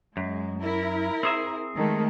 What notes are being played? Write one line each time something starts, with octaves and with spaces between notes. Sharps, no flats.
F#2 G#3
E4 A#4
C4 G#4 E5
D#3 G#3 A3